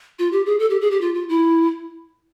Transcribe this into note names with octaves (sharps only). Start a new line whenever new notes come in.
F4
G4
G#4
A4
G4
G#4
G4
F4
F4
E4